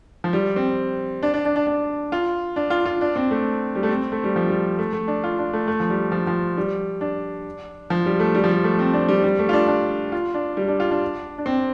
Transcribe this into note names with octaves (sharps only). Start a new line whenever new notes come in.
F3
G3
C4
D4
D4
D4
D4
D4
F4
D4
F4
F4
D4
C4
A3
G3
A3
C4
A3
G3
F3
G3
A3
A3
D4
F4
D4
A3
A3
F3
G3
F3
F3
G3
D4
F3
G3
A3
G3
F3
G3
A3
C4
D4
G3
G3
A3
F4
D4
D4
F4
D4
G3
D4
F4
D4
D4
C4